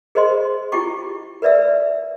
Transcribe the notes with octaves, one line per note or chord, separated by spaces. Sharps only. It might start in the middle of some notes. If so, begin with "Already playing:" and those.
G#4 A#4 C5 D#5 C6
E4 F4 G4 G5 C#6 D6
A#4 B4 D5 E5 E6